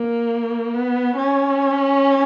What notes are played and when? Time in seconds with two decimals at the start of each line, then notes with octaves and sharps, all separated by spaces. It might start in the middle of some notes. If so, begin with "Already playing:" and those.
Already playing: A#3
0.74 B3
1.16 C#4